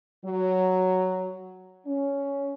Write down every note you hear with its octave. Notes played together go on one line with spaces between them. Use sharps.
F#3
C#4